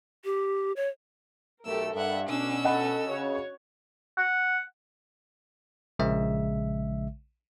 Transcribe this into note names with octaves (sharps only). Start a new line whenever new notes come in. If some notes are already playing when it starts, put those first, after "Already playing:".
G4
C#5
B1 A3 G4 A4 A#4 E6
G2 E5 F#5
B2 C#4 D4 E6
A4 D#5 F#5 B5
C#3 F#4 C#5
F#5
A#1 C#3 G#3 E5